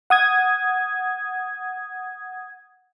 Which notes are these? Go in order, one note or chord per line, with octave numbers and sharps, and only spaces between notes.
F#5 D#6 G#6